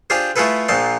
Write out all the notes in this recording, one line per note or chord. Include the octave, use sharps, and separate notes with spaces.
D4 F4 G4 G#4 C5
A3 E4 F4 G#4 A4 B4
A#1 A#2 F3 A5 C6